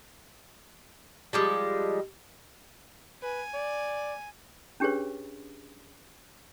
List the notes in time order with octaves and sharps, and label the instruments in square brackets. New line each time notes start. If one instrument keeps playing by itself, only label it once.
[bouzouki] F3 G3 G#3
[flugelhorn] B4 [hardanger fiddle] G#5
[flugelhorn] D5
[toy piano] C#4 D4 G4 G#4 B4 C#5